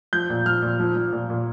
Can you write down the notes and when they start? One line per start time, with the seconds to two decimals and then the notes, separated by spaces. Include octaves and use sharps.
0.13 F3 G6
0.30 A#2
0.46 F3 F6
0.62 A#2
0.80 F3
0.96 F3
1.12 A#2
1.30 A#2